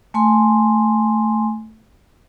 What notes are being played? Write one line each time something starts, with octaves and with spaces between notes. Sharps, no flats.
A3 G#5 C6